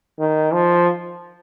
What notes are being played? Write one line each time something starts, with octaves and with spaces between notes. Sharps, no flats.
D#3
F3